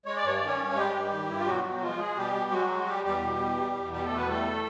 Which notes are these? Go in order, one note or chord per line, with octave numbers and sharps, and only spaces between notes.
G#3 C#5
D5
G2 C#5
D5
D#3 C#4 C#5
G2
G3 G#3 G4
G2
D#3
G2 E4
F4
B2 F#3 F#4
B2
F3 G#3 F4
G#3 G#4
B2 G3 G4
B2
F#3 G#3 F#4
G#3
G3 G4
E2 G3 G4
B2
E2
G3
E2
B2 G3 G4
A3 A4
E2
B3 B4
G3 A3 A4